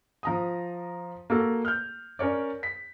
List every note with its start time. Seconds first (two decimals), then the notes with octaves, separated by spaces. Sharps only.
0.23 F3 A#5 D#6
1.30 A#3 F#4 A4
1.65 F6 G6
2.19 C#4 A#4 C#5 D5
2.63 B6